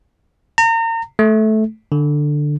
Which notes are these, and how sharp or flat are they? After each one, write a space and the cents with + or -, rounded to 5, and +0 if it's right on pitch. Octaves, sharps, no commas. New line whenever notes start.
A#5 -35
A3 -15
D3 +10